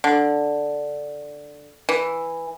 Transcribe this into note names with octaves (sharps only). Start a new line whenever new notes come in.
D3
E3